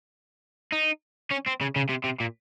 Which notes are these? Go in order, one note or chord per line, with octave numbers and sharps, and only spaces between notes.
D#4
C#4
C4
C#3
C#3
C3
C3
A#2